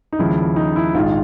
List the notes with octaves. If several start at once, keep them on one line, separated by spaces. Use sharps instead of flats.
D#4
D#2 C#3 F3 G#3 E4
D#4
E4
A#1 G#2 D#3 G#3 F4